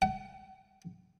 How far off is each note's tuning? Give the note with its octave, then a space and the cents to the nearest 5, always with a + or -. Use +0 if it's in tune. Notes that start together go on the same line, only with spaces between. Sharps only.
F#5 +40